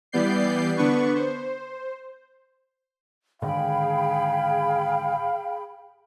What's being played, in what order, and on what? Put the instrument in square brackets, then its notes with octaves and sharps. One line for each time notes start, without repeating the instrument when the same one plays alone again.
[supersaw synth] E3 G3 B3 D5 G6 C7
D3 B3 D4 B4 C#6
C5
[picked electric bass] G#2 D3 D#3 [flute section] G#4 G5 B5 [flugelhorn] F5